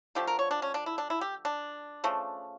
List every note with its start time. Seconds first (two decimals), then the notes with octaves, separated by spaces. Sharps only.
0.15 D3 F3 A3 G4
0.27 A#4
0.39 C#5
0.51 D4
0.62 C#4
0.74 D4
0.86 E4
0.98 D4
1.10 E4
1.21 G4
1.45 D4
2.04 C#3 F3 A3